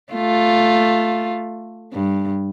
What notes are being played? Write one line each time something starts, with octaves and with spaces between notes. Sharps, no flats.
A3 F4
G2